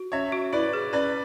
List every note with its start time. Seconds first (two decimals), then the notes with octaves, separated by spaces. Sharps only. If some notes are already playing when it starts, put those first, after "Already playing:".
Already playing: F#4
0.12 C#4 C#5 E5
0.32 F#4
0.53 E4 B4 D5
0.73 G#4
0.93 C#4 B4 D5